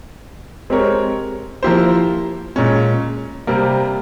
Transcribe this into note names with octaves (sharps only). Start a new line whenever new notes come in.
G#3 C4 G4 A#4 C#5
F3 A#3 E4 G4 C5
A#2 G#3 C#4
C3 G3 A#3